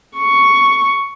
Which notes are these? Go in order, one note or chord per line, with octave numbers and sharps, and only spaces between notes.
C#6